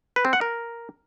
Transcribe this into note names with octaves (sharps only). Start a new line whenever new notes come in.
B4
C4
F#5
A#4